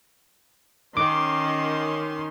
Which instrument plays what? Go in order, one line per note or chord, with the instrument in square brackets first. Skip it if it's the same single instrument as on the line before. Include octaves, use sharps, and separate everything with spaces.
[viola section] D#3 C#4 C6 [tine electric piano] D6